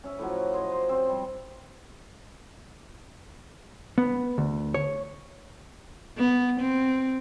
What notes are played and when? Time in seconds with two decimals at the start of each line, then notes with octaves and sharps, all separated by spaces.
0.04 C#4 E5
0.19 A2 F3 F#3
0.53 C5 D#5 G#5
0.72 C5
0.89 C4
1.09 G3
3.98 B3
4.38 D2
4.74 C#5
6.18 B3
6.60 C4